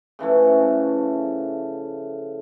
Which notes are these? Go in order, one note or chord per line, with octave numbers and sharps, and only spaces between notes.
C#3 E3 F3 A3